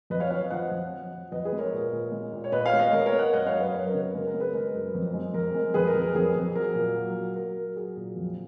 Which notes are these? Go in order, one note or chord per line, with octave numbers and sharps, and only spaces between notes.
F2 B4 D#5
C#5 F5
F3 C#5 F5
F3 D#5 F#5
F2
F3
F3
F2 B4 D#5
G#4 B4
G#3
A#4 C#5
A#2
A#2
G#3
A#2
C#5
A#2 B4 D#5
C#5 F5
G#3
B4 D#5
G#3 A#4 C#5
A#4 C#5
G#3
D#5 F#5
F#2 D#5 F#5
C#5 F5
F#2
B4 D#5
F#2 A#4 C#5
A#4
C#3
A#4
G#3 A#4
A#4
G#3
G#4 B4
G#3 A#4
F#2
F2
G#3
F2 A#4
G#3
F2 G#4 B4
A#4
F2
A#4
F2 G#4
F2
F#3 A#4
A#2
F#3
F#3
F#3 A#4
F#3
F#3 G#4
A#2
F2